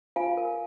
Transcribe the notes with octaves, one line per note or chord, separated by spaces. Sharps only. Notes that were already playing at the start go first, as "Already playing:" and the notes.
F4 F5 G#5
A#4